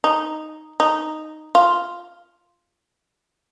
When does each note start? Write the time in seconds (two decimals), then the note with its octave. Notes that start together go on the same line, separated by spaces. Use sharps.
0.04 D#4
0.80 D#4
1.55 F4